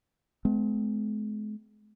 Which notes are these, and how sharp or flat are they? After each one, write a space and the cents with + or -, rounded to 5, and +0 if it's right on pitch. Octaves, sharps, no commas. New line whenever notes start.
G#3 +40 C4 -45